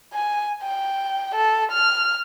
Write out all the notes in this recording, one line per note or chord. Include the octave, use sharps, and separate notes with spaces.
G#5
G5
A4
F6